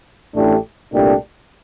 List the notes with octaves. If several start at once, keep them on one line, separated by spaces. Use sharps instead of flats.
A1 A2 A3 D4 G4
C2 A#2 A3 D4 G4